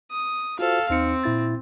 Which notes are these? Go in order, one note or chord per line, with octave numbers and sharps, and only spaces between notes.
D#6
F4 F#4 A4 C5 F5
D#2 C4 D#4 C#7
A#2 E4 A6